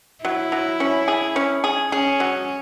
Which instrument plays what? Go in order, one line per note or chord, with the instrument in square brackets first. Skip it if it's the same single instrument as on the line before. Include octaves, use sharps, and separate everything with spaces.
[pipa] F#3 [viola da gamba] E4
[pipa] F#3
C#4
G#4
C#4
G#4
[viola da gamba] C#4 [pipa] G#4
[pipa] F#3